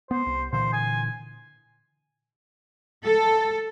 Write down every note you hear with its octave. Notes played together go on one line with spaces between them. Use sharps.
B3 C5
C2
A#2 D3 E3 C5
G#5
A4